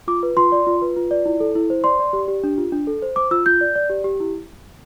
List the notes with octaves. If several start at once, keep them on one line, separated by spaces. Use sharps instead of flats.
F4 D6
B4
F4 C6
D5
F4
B4
F4
D5
E4
A4
E4
C5
D5 C6
D5
G4
G4
D4
F4
D4
A4
C5
C5 D6
F4 E6
F4 G6
D5
D5
G4
G4
E4